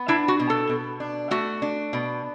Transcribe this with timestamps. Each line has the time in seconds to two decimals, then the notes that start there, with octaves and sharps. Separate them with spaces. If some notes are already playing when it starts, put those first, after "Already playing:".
Already playing: B3
0.08 D4 E4
0.28 F#4
0.40 B2
0.50 A4
0.69 B2
1.00 D4
1.31 A3 F#4
1.62 D4
1.93 B2